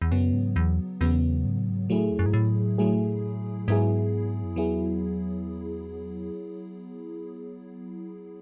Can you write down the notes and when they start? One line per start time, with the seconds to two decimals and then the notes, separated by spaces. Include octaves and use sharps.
0.02 E2
0.11 F#2 C#3 F#3 B3
0.33 G#2
0.56 E2
1.01 E2 C#3 F#3 B3
1.45 G#2
1.57 A2
1.69 G#2
1.89 A2 F#3 A3 E4 G#4
2.11 E2
2.19 F#2
2.26 G#2
2.33 A2
2.78 F#3 A3 E4 G#4
3.68 G#2 F#3 B3 E4 G#4
4.44 F#2
4.56 E2 F#3 B3 E4 G#4